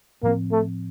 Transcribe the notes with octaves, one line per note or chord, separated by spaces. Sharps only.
A2 F3 A#3 C4
A3